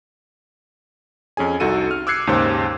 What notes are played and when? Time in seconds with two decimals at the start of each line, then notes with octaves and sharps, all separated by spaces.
1.37 F2 C#4 G#4 G#5
1.60 C2 D#4 F#4 A4 D#7
1.91 F6
2.07 D6 E6 F#6 G#6 C7 C#7
2.27 D#2 G#2 C#3 G4 C5